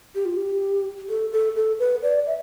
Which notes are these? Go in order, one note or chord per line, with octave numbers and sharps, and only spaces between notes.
G4
F4
G4
A4
A4
A4
B4
D5
E5